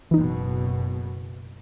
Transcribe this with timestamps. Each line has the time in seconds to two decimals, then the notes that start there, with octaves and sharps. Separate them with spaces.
0.11 F#1 B2 E3 D#4